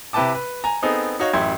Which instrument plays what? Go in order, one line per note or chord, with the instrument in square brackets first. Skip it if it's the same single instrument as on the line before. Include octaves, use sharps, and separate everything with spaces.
[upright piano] C3 E4 B4 G5 A5 D6
B4
G#5 A#5
B3 C4 D#4 G#4 A4
D#4 F#4 C#5 F5
A1 F#2 E4 G4 C6 G#6